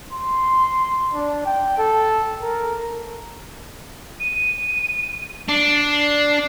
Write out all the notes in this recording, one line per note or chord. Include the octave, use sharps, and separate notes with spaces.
C6
D4
G5
A4
A#4
D#7
D4 C7
C7